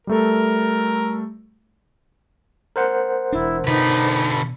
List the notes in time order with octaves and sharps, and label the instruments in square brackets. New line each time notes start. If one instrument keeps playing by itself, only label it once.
[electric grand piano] G3 A3 A4 [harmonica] A#4
[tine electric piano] A#4 C5 F#5
[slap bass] E1 D4 [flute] E4
[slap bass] B2 [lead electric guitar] D3 B4 [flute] D#4